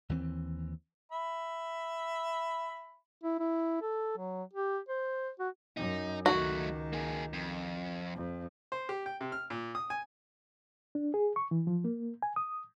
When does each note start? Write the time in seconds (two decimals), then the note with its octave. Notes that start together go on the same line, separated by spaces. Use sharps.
0.09 D#2 E3 A3 C4
1.12 E5 B5
3.24 E4
3.40 E4
3.82 A4
4.17 F#3
4.53 G4
4.89 C5
5.39 F#4
5.77 F#2 D#4
6.26 C#2 D#3 F#3 A3 F#4
6.93 A#3 G#4
7.33 F2
8.15 F2
8.72 C5
8.89 G4
9.06 G5
9.21 C3
9.32 F6
9.50 A#2
9.75 D#6
9.90 G#5
10.95 D4
11.14 G#4
11.36 C#6
11.51 E3
11.67 F3
11.84 A#3
12.22 G#5
12.36 D#6